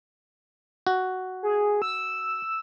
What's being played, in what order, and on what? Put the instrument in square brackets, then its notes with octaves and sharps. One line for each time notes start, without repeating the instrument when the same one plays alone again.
[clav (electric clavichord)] F#4
[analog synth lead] G#4
E6